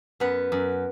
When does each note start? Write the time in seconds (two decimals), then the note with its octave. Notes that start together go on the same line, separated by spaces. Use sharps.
0.20 F#2 B3 B4
0.52 F#2